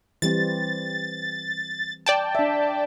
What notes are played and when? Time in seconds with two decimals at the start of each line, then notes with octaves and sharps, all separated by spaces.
0.22 E3 G3 C4 A6
2.06 D5 G5 A5
2.35 D4 E5